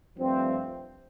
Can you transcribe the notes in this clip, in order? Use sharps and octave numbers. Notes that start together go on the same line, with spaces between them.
G2 F3 A3 C4